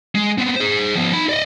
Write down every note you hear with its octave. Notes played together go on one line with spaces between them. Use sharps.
G#3
B3 C4
G#4 C5
F3 B3
D#4 B5
D5 D#5